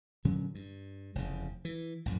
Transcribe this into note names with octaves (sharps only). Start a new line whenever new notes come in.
A#2 D3 F#3 C#4
G2
F1 E2 C#3
E3
A#1 F#2 A2